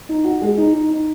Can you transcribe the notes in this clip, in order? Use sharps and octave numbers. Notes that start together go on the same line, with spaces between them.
D#4
F#4
G#3
D#4
D#4
D#4